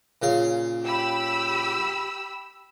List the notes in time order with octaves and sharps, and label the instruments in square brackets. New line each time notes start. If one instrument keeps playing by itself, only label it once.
[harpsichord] A#2 C#3 F5
[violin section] G4 B5 E6